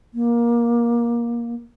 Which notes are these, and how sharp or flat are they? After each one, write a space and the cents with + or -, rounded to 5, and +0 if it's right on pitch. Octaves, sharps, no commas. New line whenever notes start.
A#3 +20